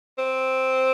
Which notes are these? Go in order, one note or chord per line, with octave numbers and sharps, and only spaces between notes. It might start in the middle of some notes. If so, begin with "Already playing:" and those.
C4